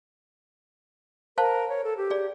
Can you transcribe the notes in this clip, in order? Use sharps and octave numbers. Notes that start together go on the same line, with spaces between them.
A#4 C5 F5 A5
C#5
A4
G4
G#4 D5